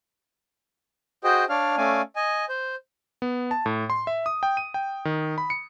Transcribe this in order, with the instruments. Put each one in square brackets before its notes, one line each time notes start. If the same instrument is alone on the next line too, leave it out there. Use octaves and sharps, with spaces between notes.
[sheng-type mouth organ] F#4 G#4 C5 D#5 G5
D4 C#5 D5 F5 F6
A3 C#4 D5 F5 G#5
D#5 G#5
C5
[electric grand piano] B3
A5
A2
C6
E5
D#6
G5
D#7
G5
D#3
B5
C#7